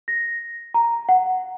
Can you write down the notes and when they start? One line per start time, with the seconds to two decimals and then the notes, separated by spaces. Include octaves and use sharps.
0.08 A#6
0.74 A#5
1.09 F#5